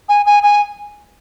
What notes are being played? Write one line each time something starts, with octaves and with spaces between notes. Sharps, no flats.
G#5
G#5
G#5